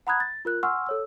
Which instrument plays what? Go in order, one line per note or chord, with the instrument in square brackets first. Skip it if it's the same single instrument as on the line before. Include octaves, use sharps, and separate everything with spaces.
[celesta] F#5 A#5 B5 D#6 F#6 G#6
A6
F4 A#4 F#6
F#5 G#5 C6 C#6 E6 F6
A4 C#5 E6